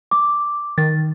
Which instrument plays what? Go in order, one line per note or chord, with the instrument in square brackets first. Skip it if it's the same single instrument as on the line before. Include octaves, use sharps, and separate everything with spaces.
[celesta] D6
[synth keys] D#3 [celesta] A6